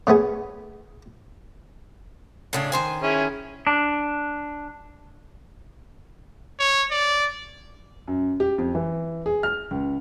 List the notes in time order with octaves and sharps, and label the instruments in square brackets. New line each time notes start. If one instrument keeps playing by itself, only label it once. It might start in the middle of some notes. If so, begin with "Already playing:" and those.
[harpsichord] C#3 A3 B3 G#4
[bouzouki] A2 C#3 D4
D#3 C5 G#5
[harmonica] C#4 E4 G#4
[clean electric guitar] D4
[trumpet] C#5
D5
[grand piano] F#2
G4
F2
E3
G#4
F6
C#2